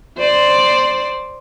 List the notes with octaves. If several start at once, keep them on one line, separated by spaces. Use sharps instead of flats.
C5 D5